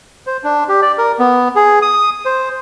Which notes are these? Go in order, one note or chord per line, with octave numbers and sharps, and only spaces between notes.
C5
D4
G4
D5
A#4
B3
G#4
D#6
C5